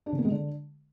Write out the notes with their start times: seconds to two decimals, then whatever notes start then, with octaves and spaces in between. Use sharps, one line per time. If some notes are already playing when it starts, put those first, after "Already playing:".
0.06 D4
0.12 C#3
0.19 A#3
0.25 G#3
0.31 D3